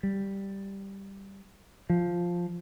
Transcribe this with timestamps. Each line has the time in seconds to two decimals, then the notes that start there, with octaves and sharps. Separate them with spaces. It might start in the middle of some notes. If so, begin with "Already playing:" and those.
0.03 G3
1.90 F3